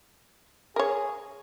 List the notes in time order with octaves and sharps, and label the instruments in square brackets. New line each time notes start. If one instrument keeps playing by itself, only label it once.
[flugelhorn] G#4 [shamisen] A#4 C#5